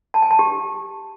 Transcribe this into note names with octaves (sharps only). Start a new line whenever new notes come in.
A5
G#5
A5
G4